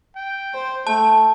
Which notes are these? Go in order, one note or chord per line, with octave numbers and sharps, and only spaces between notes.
G5
C5
A3 G5 A5